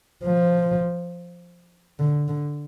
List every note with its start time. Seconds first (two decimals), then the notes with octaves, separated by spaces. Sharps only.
0.24 F3
2.00 D3
2.28 D3